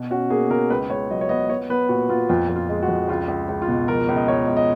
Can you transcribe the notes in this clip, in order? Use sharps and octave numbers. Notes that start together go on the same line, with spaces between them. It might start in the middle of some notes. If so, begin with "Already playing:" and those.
Already playing: B2
C#4 F#4
A#3 G#4
B2 A#4
C#2 B4
C#2 C#5
F#3 D#5
C#5
B3 D#5
B3 C#5
B3 B4
A#2 F#4
B3 F4
F2 F4
F2
F4
G#3
F#4
F2
C#2 F4
C#2
C#2
F4
B2
F3 A#4
C#2
D#5
C#2 C#5
C#2
D#5